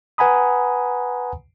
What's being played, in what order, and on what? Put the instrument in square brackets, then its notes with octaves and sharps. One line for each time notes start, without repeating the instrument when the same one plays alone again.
[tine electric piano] B4 F#5 G#5 A#5 B5 D#6